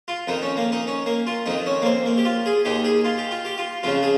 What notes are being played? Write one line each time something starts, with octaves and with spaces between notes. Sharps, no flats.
F4
F2 D#3 D#4
C#4
A#3
D#4
C#4
A#3
F4
F2 D#3 D#4
C#4
A#3
C4
A#3
G4
F4
G#4
D#2 D#3 G4
G#4
F4
G4
F4
G4
F4
F2 C#3 F3 F4
G#4